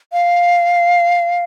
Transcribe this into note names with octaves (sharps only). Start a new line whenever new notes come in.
F5